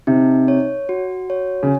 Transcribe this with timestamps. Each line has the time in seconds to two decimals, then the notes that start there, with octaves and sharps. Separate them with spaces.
0.07 C3 D#4
0.48 C#5
0.89 F#4
1.30 C#5
1.63 C#3